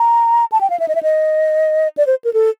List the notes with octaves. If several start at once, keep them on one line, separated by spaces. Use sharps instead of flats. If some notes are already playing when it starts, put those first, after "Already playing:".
Already playing: A#5
A5
G5
F5
E5
D#5
E5
D#5
D5
C5
A#4
A4